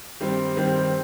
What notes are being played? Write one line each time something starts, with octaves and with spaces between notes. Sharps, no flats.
G2 D#3 G3 C4
G2 D#3 G3 C4